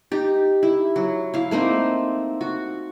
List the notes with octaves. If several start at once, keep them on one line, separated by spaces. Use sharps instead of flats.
D#4 G4
E4
F#3
E4 F5
A3 A#3 C4 D#4
F#4